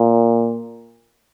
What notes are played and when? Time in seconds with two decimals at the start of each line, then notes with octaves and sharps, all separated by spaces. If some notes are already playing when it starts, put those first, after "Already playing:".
Already playing: A#2